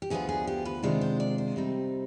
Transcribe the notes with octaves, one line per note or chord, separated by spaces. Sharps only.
G4
D2 D3 F3 B3 F4 G#4
G#4
G4
B4
C3 D#3 G#3 D4 F4 C5
C5
D5
C5
C3 G3 C4 D#4